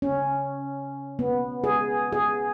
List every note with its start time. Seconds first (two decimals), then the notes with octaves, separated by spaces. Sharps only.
0.02 C#4
1.19 B3
1.64 G#4
2.12 G#4